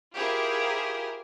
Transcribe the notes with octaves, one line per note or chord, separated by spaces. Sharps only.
E4 F4 G4 G#4 A#4 C5